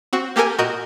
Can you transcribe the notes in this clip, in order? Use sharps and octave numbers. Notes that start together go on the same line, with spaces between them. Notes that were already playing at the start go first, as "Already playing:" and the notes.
C4 F#4
A#3 G4 A4 A#4 G#5
A#2 F#4 A#4 D#5 G6